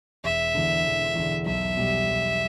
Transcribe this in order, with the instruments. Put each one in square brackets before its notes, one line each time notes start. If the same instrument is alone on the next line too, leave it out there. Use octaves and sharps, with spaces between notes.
[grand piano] E1 [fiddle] E5
[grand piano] E2 D3
E1
E2 D3
[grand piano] B1 [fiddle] E5
[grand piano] B2 G3
B1